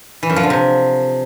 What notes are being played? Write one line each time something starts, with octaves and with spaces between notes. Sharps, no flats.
E3
F#2
F3
D3
C3